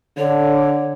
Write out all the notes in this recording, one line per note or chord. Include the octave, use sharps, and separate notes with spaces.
D3 C#5